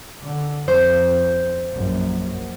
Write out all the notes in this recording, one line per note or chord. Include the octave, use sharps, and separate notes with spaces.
D3
F2 C5
A#1 F#2